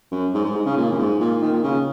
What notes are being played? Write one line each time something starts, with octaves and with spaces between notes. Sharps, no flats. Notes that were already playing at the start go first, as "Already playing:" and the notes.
F#2
G#2
G#2
G#2
C#3
A#2
F#2
G#2
A#2
D#3
A#2
C#3